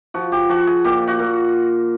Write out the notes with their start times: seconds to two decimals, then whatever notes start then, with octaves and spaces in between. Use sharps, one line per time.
0.14 F3 F#4
0.32 G4
0.49 F3 F#4
0.67 G#4
0.84 A#2 G4
1.07 F#4
1.19 A#2